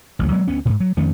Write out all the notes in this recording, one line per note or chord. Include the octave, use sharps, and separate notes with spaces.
A1 D2 F#3
F#3 G#3 B3
D2 B3 C#4
G#2 B2
F#3
F2 D#3 A3 C#4